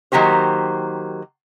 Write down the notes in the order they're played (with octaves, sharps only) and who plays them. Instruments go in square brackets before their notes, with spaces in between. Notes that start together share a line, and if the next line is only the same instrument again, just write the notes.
[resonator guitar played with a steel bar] D#3 F#3 A#3 G4 C5